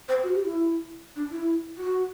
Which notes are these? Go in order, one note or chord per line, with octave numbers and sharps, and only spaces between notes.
C5
F#4
G4
E4
D4
E4
F#4